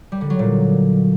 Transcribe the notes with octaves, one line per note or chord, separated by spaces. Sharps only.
G3
D3
F#3
A#2